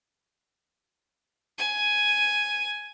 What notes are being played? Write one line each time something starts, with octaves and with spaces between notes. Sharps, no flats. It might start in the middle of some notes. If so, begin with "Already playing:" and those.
G#5